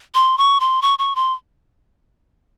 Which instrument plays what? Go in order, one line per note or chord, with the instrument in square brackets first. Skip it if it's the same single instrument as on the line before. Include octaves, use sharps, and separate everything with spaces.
[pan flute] C6
C#6
C6
C#6
C#6
C6